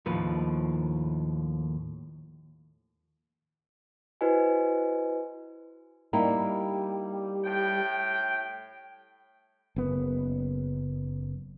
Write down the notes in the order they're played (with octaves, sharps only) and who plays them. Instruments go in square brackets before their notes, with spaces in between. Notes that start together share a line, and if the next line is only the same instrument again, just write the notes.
[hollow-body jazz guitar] D#2 A2 F3 B4
[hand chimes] E4 F#4 B4 C5 D#5 G#5
[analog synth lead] G3 [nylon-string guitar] A#3 D#4 E4
[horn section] A2 G5
[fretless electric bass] F#1 B3